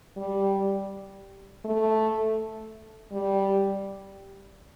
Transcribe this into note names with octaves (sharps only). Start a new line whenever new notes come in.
G3
A3
G3